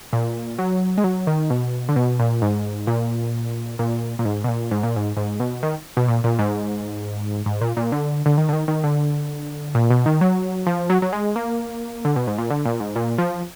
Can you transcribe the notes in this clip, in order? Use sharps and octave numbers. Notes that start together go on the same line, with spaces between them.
A#2
F#3
G#3
F#3
D#3
B2
D3
B2
A#2
G#2
A#2
A#2
A#2
G#2
B2
A#2
G#2
A#2
G#2
G#2
B2
D#3
B2
A#2
A#2
G#2
G#2
A#2
A#2
D3
D3
D#3
D3
D#3
D#3
D3
A#2
B2
D#3
F#3
F3
F#3
F#3
G#3
A#3
D3
B2
G#2
A#2
D3
A#2
G#2
A#2
F3